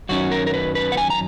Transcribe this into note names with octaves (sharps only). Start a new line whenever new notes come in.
F#2 D#3 F#3 C#4 F#4
A#4
A#4
B4
B4
F#5
G#5
A#5